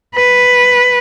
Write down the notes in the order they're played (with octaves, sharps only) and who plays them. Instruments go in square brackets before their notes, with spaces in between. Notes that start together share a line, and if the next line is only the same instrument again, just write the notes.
[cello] B4